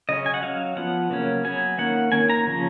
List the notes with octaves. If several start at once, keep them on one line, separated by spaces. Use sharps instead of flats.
C#3 F#3 C#4 D#5
G#5
F#5
F#3 C#4 F5
F3 B3 F#5
C#3 F#3 A#3 C#4
F#3 B3 G#5
D#3 A#3 C#4 F#5
D#3 A#3 C#4 G#5
A#5
C#3 F3 C#4